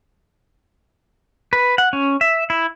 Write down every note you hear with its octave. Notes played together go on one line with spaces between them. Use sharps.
B4
F#5
C#4
E5
E4